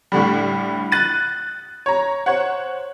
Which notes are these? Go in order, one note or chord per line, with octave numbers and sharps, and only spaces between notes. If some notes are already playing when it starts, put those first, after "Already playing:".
A2 D3 G3
F#6 A6 D#7
C#5 A#5
C5 C#5 F#5